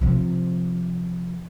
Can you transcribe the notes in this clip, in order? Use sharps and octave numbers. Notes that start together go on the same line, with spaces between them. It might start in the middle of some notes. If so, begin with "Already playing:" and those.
C3 F3